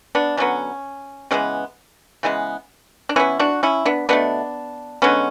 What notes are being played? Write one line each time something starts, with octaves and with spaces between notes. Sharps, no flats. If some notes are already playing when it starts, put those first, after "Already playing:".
B3 D4
D3 F#3 B3 C#4
C#3 E3 G#3 B3 C#4
C#3 E3 G#3 B3
D4
E3 B3 C#4 E4
D4 F#4
C#4 E4
B3 D4
B2 F#3 A3 B3 D4
D3 G#3 B3 C#4